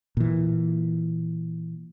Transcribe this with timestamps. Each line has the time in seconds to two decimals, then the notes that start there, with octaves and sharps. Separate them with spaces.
0.17 A#2 E3